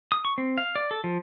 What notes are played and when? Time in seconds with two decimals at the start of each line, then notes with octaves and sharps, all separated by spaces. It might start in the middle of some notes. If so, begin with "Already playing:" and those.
0.12 D#6
0.25 C#6
0.38 C4
0.58 F5
0.76 D5
0.91 A4
1.04 F3